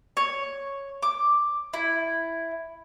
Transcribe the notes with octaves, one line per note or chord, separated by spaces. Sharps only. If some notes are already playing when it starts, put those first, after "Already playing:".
C#5
D6
E4